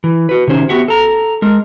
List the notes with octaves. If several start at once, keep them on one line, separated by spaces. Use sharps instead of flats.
E3
F#4 B4
C3 D#3 C#4 C5
B3 F#4 G4 E5 F#5
A4 A#5
G#3 A#4